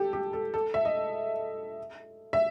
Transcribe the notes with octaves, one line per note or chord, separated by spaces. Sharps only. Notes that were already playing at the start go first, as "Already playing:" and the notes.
Already playing: G4 A4
G4
A4
A4
E5
D#5
E5